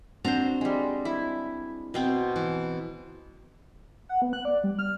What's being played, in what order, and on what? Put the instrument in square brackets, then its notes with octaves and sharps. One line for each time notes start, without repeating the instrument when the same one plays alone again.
[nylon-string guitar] C4 D4 F#4 [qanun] C5 A#5
[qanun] G3 G#3
E4
B2 C4 G5
[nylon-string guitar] E3
[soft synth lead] F#5
B3
F#6
D5
G3
F6